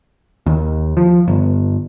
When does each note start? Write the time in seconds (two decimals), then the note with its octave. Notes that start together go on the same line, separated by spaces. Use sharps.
0.46 D#2
0.97 F3
1.28 G1